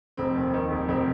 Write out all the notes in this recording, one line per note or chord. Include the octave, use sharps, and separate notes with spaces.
F1 C4
D#2
D#3
F1
F1 C4